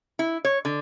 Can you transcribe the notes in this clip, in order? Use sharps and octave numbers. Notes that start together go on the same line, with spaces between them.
E4
C#5
D3